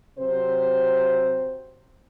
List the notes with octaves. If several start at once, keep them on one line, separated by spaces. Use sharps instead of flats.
C3 F#3 C4 C5